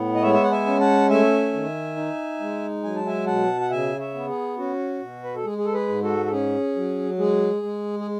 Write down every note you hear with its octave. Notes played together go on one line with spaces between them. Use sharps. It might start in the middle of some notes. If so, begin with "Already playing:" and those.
Already playing: A2 B3
D#5
G#3 C#5 E5
E5
F#5
E5 G#5
C#4
F#5 A5
A3 E5 G#5
D#3
D#4
G#3
F#3 G#5
A5
E5 G#5
B2 F#5 A5
F#5
C#3 E5 G#5
C#5 E5
B3
G#4
C#4 F#4
B2
B4
A4
G#3 G#4
G#4
A4
G#4 B4
G#2
F#4 A4
A4
C#4 G#4
F#3
G#3 G#4
G#3
G#4